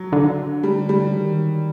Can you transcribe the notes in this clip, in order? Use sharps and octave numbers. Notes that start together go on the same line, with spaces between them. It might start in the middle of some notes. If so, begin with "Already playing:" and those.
Already playing: F#3
D3
G3
G3
D#3